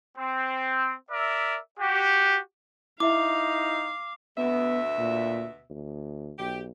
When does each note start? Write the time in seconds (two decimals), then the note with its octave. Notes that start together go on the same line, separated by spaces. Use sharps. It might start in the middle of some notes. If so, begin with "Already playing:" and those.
0.17 C4
1.11 A#4 D5 E5
1.79 F#4 G4
3.00 D#4 E4 E5 F5 D6
4.38 D2 B2 B3 E5
4.98 A#2
5.70 D2
6.39 B1 G4